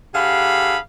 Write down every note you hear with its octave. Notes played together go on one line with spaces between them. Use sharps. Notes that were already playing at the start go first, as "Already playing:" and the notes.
D3 G4 G#4 F5 B5